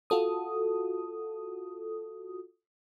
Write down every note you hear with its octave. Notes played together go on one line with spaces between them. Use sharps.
F4 F#4 A4 D#6